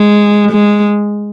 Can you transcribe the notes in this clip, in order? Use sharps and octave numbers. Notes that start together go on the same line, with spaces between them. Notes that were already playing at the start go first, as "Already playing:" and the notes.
Already playing: G#3
G#3